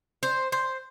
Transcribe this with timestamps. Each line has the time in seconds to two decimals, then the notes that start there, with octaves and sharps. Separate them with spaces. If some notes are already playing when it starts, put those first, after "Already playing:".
0.23 C5
0.52 C5